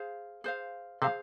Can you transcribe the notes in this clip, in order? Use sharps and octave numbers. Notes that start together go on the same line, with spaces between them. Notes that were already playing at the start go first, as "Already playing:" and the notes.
Already playing: G#4 C5 F5
G#4 C5 F5
C3 G#4 C5 F5